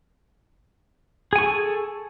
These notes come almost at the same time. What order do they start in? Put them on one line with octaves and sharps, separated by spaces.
G#4 G#5 C#6 A4